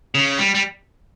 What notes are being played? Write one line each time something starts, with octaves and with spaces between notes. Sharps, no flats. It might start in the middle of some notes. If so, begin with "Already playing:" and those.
C#3
G3
G3